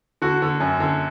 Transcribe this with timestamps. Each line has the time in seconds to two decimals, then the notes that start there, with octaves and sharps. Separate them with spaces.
0.22 D3 F#4
0.42 D3
0.60 F#2
0.80 D3